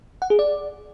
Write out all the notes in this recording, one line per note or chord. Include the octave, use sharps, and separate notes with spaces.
F#5
G#4
D5